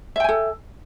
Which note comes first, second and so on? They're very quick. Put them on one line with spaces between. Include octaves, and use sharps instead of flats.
E5 G5 G#5 A4